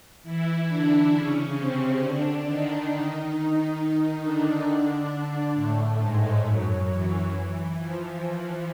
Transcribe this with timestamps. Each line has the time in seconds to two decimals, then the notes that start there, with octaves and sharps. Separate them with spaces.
0.23 E3 E4
0.68 D3 D4
1.11 C#3 C#4
1.56 C3 C4
2.00 D3 D4
2.44 D#3 D#4
2.89 D#3 D#4
4.22 D3 D4
5.54 A2 A3
5.99 G#2 G#3
6.43 F#2 F#3
6.87 E3
7.76 F3